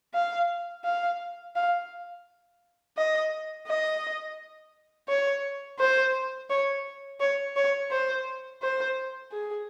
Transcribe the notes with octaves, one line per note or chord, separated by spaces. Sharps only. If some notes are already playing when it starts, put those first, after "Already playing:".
F5
F5
F5
D#5
D#5
C#5
C5
C#5
C#5
C#5
C5
C5
G#4